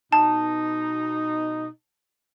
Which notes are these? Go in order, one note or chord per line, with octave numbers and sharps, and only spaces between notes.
B2 D#4 A5